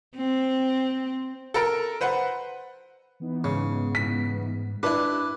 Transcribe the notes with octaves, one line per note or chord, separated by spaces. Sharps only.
C4
A4 A#4
B4 C5 F#5
E3 B3 D#4
G#2 C#3
B6
D4 E4 G4 B4